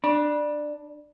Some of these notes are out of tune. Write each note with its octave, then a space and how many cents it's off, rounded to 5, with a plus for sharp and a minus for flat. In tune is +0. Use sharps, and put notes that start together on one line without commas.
D4 +15 B5 -30